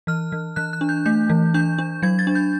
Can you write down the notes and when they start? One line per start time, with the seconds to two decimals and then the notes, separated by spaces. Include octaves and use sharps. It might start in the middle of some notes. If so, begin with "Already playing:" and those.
0.07 E3 F6
0.32 E3
0.56 E3 F#6
0.73 F#6
0.81 D4
0.89 G6
1.05 A3 G6
1.30 E3
1.54 D4 G6
1.78 D4
2.03 F#3 G#6
2.19 A6
2.27 D4
2.35 G6